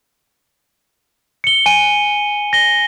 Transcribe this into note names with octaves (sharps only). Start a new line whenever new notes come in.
C#7 G7
G#5 D#7
A#6 G7